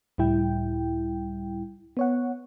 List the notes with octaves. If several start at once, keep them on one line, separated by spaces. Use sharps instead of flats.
C#2 A2 G3 E4 G5
B3 C#5 F#5